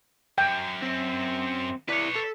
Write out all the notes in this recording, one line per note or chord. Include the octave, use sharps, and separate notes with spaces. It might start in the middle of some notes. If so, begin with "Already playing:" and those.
F#2 G5
C4
E4 B4 C#5 D5
A4